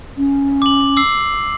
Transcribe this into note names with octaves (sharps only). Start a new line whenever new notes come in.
C#4
D6 F#7
D6 E6 C7